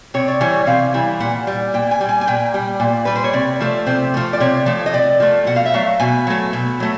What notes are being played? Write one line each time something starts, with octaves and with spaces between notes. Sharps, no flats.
C3 C#5
D5
E3 G3 C#5
C3 F5
E3 G3
A#2 F#5
G3
A#2 G5
G#5
G3
G#5
G#5
A#2 G5
G3
A#2
G3 B4
C5
C#5
C3 D5
F3 A3
C3 C5
F3 A3
D5
C3 C#5
F3 A3
D#5
C3 D5
F3 A3
B2 F#5
F5
E5
F#3 A3 F5
B2 G#5
F#3 A3
B2
F#3 A3